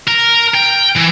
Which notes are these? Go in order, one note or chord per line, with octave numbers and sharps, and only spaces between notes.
A#4
G5
E3